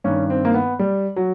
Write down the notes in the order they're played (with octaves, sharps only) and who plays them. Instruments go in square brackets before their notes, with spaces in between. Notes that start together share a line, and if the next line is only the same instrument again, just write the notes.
[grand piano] G2 D#3 C#4
C4
A#3
B3
G3
F#3